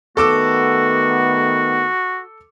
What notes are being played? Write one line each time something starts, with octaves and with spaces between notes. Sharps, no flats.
D#3 A3 B3 F#4 A4 D6 E6